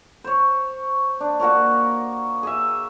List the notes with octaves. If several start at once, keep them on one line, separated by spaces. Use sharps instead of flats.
C5 C#5
D4
A#3 F#4 A#4 C#5
G#4 E5